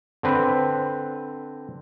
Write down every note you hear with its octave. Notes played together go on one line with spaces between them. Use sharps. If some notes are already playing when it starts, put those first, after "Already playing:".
D3 C4 B4